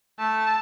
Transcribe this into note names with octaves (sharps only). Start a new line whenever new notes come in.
A3 A5